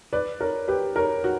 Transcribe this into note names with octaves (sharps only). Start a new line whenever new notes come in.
B4 D5
A#4 C#5
G4 B4
A#4 C#5
F#4